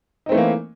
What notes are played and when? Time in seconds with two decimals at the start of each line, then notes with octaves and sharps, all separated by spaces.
0.26 D#4
0.29 C4
0.32 A3
0.35 E3
0.38 A#3